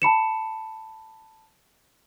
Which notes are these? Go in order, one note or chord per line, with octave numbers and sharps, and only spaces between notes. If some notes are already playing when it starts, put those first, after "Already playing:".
A5 B5 C#7 E7